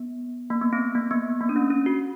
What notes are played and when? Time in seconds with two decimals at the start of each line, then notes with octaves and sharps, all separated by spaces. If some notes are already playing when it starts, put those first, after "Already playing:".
Already playing: B3
0.50 A#3
0.61 B3
0.73 C4
0.95 A#3
1.11 B3
1.41 A#3
1.49 D4
1.56 C#4
1.70 C#4
1.86 F#4